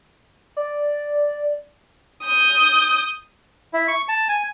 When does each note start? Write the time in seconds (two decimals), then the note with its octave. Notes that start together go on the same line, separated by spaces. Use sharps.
0.57 D5
2.23 D#6 G6
3.74 E4
3.88 C#6
4.08 A5
4.29 G#5